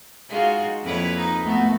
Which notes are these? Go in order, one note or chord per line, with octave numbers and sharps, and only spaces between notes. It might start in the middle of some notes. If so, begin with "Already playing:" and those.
G#3 D#4 F4 F#4
F2 A#3 E4 B4 C#5
D#4
A3 B3 F#4